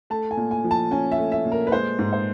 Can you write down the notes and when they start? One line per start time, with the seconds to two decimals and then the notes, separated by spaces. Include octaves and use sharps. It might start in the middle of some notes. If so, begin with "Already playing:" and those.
0.10 A3 A5
0.31 G#5
0.37 A#2
0.51 G#5
0.64 F3
0.71 A5
0.91 C#4 G#5
1.12 E5
1.18 A3
1.32 E5
1.45 A#2
1.52 A#4
1.67 B4
1.72 G#3 C5
1.99 G#2
2.13 C5